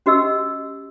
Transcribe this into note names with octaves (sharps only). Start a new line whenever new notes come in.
C#4 F#4 G4 D#5 E6